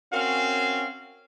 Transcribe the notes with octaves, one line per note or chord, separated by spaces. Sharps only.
C4 C#4 F#4 A#4 F5